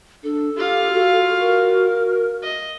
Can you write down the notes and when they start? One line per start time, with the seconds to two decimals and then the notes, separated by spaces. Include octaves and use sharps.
0.24 D4 A4
0.56 F4 G4 F5
0.93 F#4
1.40 A#4
2.42 D#5